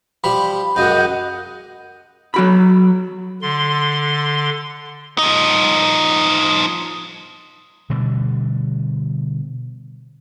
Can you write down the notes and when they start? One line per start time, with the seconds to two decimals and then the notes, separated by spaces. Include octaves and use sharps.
0.24 F3 G3 B5
0.76 C#2 F#2 D#5 F#5 G6
2.34 F#3 F#4 B5
3.42 D3 C6
5.18 F3 D#4
7.90 B2 D3 G3